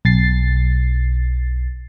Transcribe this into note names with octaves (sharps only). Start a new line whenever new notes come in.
B1 A6 C7